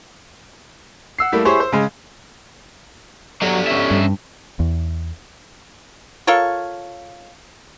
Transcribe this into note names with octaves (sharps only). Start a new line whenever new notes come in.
F#5 E6 C7
G3 A3 A#3 E4
E4 G4 G#4 C5 C#5 C#6
C5
C#3 G#3
F#3 G4 A4 D5
C#4 E5
G2
E2
F4 A4 A#4 C#5